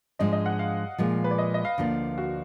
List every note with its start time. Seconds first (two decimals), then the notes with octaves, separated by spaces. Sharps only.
0.19 G#2 F3 G#3 D4 D#5
0.33 D#5
0.46 F#5
0.59 F5
0.98 A#2 F3 G#3
1.24 B4
1.31 D5
1.38 D#5
1.54 D#5
1.65 F5
1.78 D2 D3 F3 A#3 D4
2.18 F#4